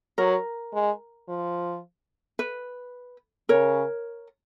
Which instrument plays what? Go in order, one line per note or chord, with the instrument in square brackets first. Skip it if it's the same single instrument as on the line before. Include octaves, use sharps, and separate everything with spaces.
[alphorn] F#3 [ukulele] A#4
[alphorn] G#3
F3
[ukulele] B4
[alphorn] C#3 [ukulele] A#4 C#5